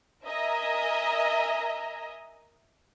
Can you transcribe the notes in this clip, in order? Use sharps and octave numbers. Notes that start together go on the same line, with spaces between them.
A#4 D#5 E5 G#5 A#5